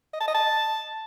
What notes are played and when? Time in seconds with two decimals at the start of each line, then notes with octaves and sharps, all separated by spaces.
0.13 D#5
0.20 A5
0.27 D#5
0.35 A5